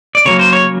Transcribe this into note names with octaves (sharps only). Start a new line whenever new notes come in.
D5
C#3 F#3 A#3 C#5
C5
C#5